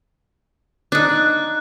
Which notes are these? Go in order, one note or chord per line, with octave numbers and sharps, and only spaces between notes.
D4 D#4 F#6